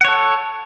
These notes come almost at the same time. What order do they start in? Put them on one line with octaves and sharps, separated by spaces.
F#5 C#5 A4